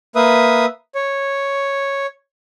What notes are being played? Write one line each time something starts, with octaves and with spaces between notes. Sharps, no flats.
A#3 B4 E5 D#6
C#5